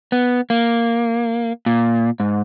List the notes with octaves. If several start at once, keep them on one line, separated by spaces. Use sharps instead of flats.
B3
A#3
A#2
G#2